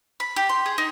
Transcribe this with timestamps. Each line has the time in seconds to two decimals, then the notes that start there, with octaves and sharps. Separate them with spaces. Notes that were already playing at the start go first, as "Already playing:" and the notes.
0.20 B5
0.36 G4
0.49 C6
0.66 G#4
0.78 D#4